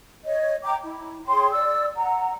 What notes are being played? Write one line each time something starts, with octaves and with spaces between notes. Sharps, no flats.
C#5 D#5
G5 A#5 D6
E4
G#4 C#5 G5 C6
D5 E6
F#5 A#5